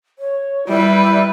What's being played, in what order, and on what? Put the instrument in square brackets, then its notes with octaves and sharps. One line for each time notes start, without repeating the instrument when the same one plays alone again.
[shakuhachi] C#5
[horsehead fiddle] G3 B4 [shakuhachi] E4